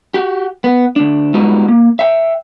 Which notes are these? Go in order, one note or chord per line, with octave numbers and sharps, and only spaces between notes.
F#4 G4
B3
D2 D4
G3 G#3 B3 D#4 F4 F#4
A#3
E5 G5